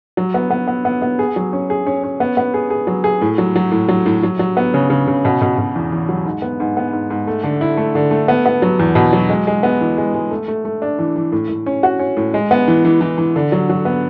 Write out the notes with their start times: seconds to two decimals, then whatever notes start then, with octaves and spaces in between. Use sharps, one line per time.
0.17 F#3
0.34 B3
0.50 B3
0.68 B3
0.85 B3
1.02 B3
1.19 G#4
1.36 F#3
1.53 C#4
1.70 G#4
1.86 C#4
2.03 C#4
2.20 B3
2.37 B3
2.54 G#4
2.70 G#4
2.87 F#3
3.04 G#4
3.21 A2
3.38 F#3
3.56 F#3
3.72 A2
3.89 F#3
4.06 A2
4.23 F#3
4.39 F#3
4.57 B3
4.74 C#3
4.90 C#3
5.08 C#3
5.25 B2
5.41 B2
5.58 B2
5.75 E2
5.92 E2
6.09 F#3
6.25 G#2
6.42 B3
6.60 G#2
6.77 B3
6.93 G#2
7.10 G#2
7.27 A3
7.44 D3
7.61 E4
7.77 A3
7.95 D3
8.11 A3
8.28 B3
8.46 B3
8.62 F#3
8.79 E2
8.95 B2
9.13 F#3
9.30 G#3
9.47 G#3
9.63 B3
9.81 E3
9.98 G#3
10.14 G#3
10.31 A3
10.48 A3
10.65 A3
10.82 D4
10.99 E3
11.16 E3
11.32 A2
11.49 A2
11.66 C#4
11.83 F#4
11.99 C#4
12.17 A2
12.34 G#3
12.51 B3
12.68 E3
12.85 E3
13.01 E3
13.18 E3
13.36 D3
13.52 F#3
13.70 F#3
13.85 B3